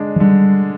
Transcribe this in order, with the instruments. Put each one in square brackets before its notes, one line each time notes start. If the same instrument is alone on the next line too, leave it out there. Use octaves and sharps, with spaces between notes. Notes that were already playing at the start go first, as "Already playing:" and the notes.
Already playing: [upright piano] D3 G#3 D4
[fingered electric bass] F3
[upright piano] D3 [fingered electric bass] G3